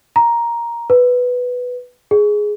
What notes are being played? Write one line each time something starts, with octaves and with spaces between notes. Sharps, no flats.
A#5
B4
G#4